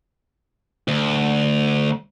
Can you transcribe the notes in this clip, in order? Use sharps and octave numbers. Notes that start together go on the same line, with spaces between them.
D2